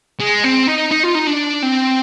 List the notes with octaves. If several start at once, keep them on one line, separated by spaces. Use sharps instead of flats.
G#3
C4
D#4
D#4
F4
D#4
D4
C4